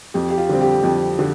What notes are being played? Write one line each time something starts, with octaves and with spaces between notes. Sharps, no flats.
F2 G4
G4
F4
D3 G3 C4
G4
F2
D3